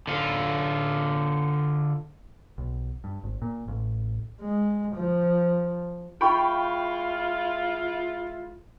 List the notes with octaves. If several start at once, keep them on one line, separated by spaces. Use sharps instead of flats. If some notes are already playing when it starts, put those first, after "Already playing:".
D3 F4
B1
G2
G#1
A#2
A1
G#3
F3
G#3 E4 F4 G5 B5 C#6